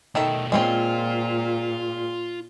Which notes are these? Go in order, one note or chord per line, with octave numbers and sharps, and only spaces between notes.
B2 D#3 A3 A4 E5
A#2 G#3 C4 C#4 F4